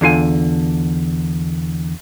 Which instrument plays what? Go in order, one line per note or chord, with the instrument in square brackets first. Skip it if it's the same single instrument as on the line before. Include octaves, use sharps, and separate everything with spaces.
[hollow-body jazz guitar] E2 D3 F4 G#5